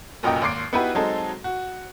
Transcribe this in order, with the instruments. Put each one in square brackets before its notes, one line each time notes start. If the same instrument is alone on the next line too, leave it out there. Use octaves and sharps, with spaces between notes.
[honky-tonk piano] F1 F#2 A#2 D#5 G5
G#1 D#2 C6 D6 C7 D7
B3 D#4 E4 F#4 G4 B4
F#3 G#3 C4 D#4 A4
F#4